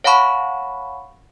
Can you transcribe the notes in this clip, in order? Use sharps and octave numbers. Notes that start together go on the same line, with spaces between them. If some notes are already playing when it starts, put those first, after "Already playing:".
C#5 F5 F#5 A5 B5 C#6